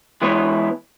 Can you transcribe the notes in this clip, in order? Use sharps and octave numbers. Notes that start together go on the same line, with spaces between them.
E3 G#3 B3 E4 B4 C#5